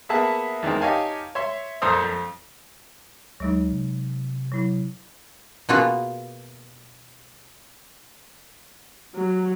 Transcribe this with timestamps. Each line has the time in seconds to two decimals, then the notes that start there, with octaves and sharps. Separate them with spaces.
0.09 A#3 B3 G#4 E5 F#5 A5
0.62 E2 D#3 G#3 C4
0.81 D#4 G4 C#5 F5 G#5 A5
1.35 C#5 E5 C6
1.82 A#1 F2 A4 C5 A#5 D#6
2.03 F2
3.40 D2 F#3 G#3 D#4
3.72 C3
4.52 F#3 E4
5.69 B2 A#3 B3 F4 F#4 G#4
9.15 F#3